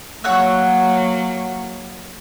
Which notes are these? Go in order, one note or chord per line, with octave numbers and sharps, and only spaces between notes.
F#3 A#3 C#5 F#5 E6